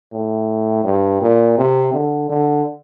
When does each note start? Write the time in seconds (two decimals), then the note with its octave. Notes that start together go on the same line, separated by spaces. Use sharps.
0.12 A2
0.84 G2
1.21 A#2
1.58 C3
1.93 D3
2.29 D3